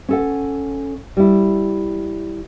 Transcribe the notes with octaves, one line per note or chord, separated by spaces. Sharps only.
C#4 A4 F#5
G3 E4